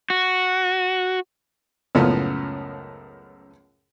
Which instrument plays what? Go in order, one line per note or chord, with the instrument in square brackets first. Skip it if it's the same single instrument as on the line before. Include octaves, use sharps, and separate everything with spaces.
[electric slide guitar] F#4
[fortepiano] C#2 F#2 A2 F3 B3